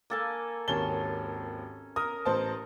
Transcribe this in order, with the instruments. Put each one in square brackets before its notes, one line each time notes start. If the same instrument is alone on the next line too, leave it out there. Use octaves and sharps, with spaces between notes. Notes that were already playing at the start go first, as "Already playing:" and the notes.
[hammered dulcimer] A#3 A4 G#5
[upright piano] G#1 D#2 G7 [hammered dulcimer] C#4 A5
[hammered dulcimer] A#4 [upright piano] D#6
[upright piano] A1 C5 A5